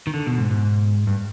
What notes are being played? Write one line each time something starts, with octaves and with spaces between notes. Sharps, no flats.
D#3
D3
B2
G#2
G#2
G2